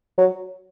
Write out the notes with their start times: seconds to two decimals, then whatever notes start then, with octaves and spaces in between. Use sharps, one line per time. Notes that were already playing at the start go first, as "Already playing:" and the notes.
0.18 F#3